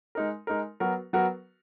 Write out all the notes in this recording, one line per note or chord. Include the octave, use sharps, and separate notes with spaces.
G#3 D#4 A#4
G#3 D#4 A#4
F#3 B3 F#4 A#4
F#3 B3 F#4 A#4